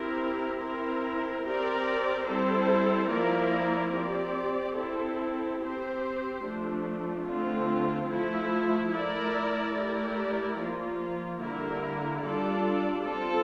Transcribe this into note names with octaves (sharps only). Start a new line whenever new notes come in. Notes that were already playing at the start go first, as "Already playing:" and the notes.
Already playing: C4 E4 G4 A#4
C4 E4 A#4
C4 G4 A#4 D5
G3 C4 E4 A4 C5
F3 A#3 E4 A#4 D5
C4 G4 D5
C4 E4 A4
C4 G4 C5
F3 A3 D4
D3 A3 C4 F4
F3 A3 E4
A3 E4 A#4 D5
A3 E4 G4 A#4 D5
F3 A#3 F4
D3 G3 A#3 E4 A#4
G3 D4 F4 A4 D5
C4 F4 A4